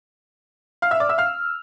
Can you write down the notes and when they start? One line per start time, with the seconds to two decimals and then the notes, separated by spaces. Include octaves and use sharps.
0.82 F5 F6
0.91 E5 E6
1.00 D5 D6
1.09 E5 E6
1.18 F5 F6